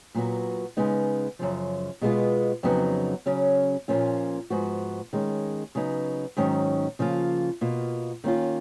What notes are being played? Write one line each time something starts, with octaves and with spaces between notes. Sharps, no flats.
A#2 F#3 B3 F#4
C#3 G#3 B3 D#4
F#2 C#3 F3
B2 G#3 B3 F4
F2 C#3 F#3 B3 D#4
C#3 F#3 C#4
A#2 F3 A#3 C#4 F4
G#2 F3 B3 F#4
D#3 G#3 C#4
C#3 F#3 B3 D#4
G#2 D#3 F#3 C#4
C#3 F3 A#3 F4
B2 A#3 F4
D#3 A#3 C#4 F4